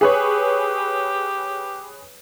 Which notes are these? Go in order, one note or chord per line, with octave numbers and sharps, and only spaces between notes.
G4 G#4 B4 C#5